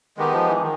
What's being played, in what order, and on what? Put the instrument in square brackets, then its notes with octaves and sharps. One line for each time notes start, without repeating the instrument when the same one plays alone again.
[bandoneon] D#3 [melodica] G#3 B3 D#4 G4
[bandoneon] F3
E3
D#3